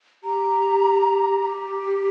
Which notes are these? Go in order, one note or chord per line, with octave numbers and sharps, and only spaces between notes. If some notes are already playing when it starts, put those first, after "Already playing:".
G4 A#5
G4